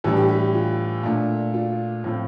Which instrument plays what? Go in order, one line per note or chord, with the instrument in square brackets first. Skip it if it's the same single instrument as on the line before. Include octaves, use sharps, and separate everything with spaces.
[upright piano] A2 E3 G3 D4 A4
G4
G4
G4
F4
A#2 A3 D4
F4
A2 F3 C4